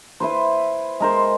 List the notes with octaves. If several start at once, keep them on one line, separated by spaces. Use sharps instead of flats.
E4 B4 C5
G#3 A#4 C5